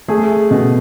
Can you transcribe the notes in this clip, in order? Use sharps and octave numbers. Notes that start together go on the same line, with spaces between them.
A3 G#4
B2